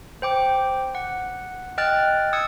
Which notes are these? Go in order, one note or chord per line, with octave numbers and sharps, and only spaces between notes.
C5 G5 D6
F#5
D#5 G5 F6 F#6 A6
D#6 E6 G#6 C#7